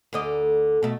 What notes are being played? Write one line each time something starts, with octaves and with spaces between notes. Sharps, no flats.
D2 D3 D#5
B2 A3